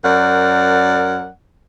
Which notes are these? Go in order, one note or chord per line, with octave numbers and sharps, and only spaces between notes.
F#2 A#4 D5 F#5